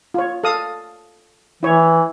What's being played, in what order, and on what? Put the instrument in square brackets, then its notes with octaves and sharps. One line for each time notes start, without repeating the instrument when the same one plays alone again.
[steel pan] F4 C#5
A4 F5 D#6
[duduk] E3 [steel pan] E4 C#5